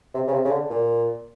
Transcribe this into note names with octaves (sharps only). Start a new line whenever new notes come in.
C3
C#3
C3
C#3
D3
A#2